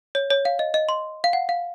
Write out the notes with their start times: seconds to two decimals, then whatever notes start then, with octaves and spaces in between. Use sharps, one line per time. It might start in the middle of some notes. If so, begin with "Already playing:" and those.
0.15 C#5
0.31 C#5
0.45 F5
0.59 D#5
0.74 D#5
0.89 C6
1.24 F5
1.33 F#5
1.49 F5